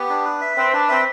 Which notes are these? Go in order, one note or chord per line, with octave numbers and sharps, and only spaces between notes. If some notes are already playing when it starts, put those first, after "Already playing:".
Already playing: B3 G4
D4
B4
E5
C4 B4
D4 B4
C4 E5